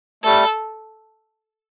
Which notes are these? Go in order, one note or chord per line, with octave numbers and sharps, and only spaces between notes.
G3 A3 A4